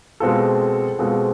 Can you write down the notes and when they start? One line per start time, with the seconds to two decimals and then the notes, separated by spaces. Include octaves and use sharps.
0.20 B2 G#3 C4 F4 A4
0.99 B2 G#3 C4 F4 A4